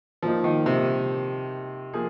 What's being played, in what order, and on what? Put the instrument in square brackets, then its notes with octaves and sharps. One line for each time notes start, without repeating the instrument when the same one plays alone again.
[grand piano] A#2 A#3 D#4 [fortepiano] F3
[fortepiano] D#3
C3
[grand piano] F3 A#3 G#4